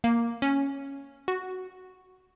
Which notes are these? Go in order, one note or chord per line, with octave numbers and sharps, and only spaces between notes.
A#3
C#4
F#4